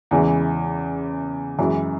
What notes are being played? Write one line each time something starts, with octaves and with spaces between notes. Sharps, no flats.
E2 C#3 E3 G#3
F#2 E3 G#3